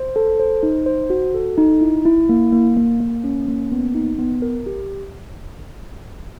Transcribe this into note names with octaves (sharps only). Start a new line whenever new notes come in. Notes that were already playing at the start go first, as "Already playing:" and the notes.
Already playing: C5
A4
C5
D#4
C5
F#4
A4
D#4
E4
E4
A#3
A#3
A#3
A#3
C#4
A#3
B3
D#4
B3
A#4
G4